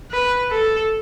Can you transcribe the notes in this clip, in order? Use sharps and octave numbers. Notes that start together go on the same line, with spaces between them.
B4
A4